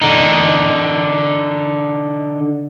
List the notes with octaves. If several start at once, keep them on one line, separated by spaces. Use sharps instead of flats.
D3 D#4